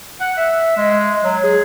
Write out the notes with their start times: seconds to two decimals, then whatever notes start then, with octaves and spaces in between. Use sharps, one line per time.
0.21 F#5
0.37 E5
0.77 G#3
1.24 F#3
1.44 G#4